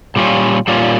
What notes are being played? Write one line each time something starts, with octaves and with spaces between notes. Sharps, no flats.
A#2 G3 C#4 F4
A#2 G3 C#4 F4